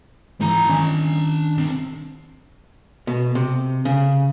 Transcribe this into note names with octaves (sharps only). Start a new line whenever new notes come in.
G#2 E3 D4 A#5
D#3 C#4 G#5
C2 C4
B2
C3
C#3